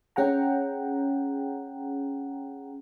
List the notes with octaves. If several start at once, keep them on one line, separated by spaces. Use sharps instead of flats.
C#4 G#4 F#5 G5 A#5